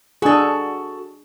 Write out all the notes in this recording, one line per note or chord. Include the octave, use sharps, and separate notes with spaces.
D4 F#4 G#4 A4